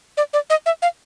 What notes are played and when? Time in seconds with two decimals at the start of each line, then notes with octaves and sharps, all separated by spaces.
0.17 D5
0.33 D5
0.50 D#5
0.66 E5
0.82 F5